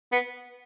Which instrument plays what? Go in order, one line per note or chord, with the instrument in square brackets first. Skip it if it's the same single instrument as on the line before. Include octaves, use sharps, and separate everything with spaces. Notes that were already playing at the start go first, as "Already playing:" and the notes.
[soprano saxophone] B3